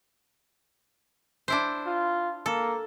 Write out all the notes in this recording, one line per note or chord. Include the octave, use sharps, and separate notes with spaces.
D4 E4 C5
F4
A#3 A4